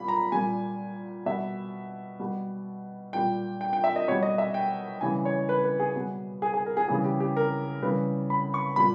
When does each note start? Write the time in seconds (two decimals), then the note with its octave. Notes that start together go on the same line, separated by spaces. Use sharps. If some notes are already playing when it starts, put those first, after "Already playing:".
Already playing: A#2 G3 B5
0.08 A#5
0.32 A#2 G3 G#5
1.26 B2 G3 E5
2.20 B2 G3
3.13 A#2 G3 G5
3.61 G5
3.73 G5
3.84 E5
3.96 D#5
4.08 B2 C#5
4.12 G3
4.23 D#5
4.38 E5
4.54 G5
5.01 C#3 E3 G3 G#5
5.25 C#5
5.49 B4
5.64 B4
5.80 G#4
5.96 B2 G3
6.42 G#4
6.54 G#4
6.66 A#4
6.77 G#4
6.89 C#3 E3 G3 G#4
7.04 G4
7.20 G4
7.37 A#4
7.82 C#3 E3 G3 B4
8.30 B5
8.54 C#6
8.76 A#2 G3 B5